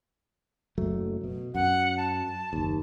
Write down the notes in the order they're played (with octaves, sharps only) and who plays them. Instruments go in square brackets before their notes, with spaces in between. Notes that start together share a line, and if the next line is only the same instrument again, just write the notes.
[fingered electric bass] F#1 F#3 A3
B2
[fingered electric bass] F#2 [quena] F#5
[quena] A5
[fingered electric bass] F#1 D#2